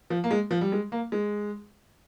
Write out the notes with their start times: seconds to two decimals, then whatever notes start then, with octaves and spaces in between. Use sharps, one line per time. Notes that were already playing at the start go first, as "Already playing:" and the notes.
0.10 F3
0.24 A#3
0.31 G#3
0.51 F3
0.61 G3
0.72 G#3
0.92 A#3
1.12 G#3